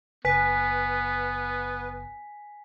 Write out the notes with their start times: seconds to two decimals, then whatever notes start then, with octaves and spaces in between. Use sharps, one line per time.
0.25 F#1 B3 B4 G#5 B6